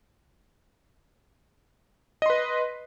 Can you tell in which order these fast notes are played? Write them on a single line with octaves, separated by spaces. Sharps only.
D#5 C6 B4